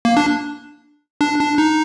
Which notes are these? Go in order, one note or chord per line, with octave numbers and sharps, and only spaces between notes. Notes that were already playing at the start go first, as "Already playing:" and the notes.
A#3
D4
D4
D4
D#4